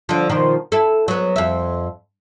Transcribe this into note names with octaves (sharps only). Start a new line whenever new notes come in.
D3 F3
B2 D#3 F3
E4 A4
F#3 B3
F2 E5